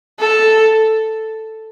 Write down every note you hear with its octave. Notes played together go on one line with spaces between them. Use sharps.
A4